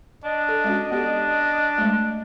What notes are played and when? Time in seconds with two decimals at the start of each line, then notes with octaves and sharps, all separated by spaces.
0.24 D4 D#5
0.49 A4
0.64 G#3 C#4 F#4
0.91 B3 D4 G4 A4
1.78 G#3 A3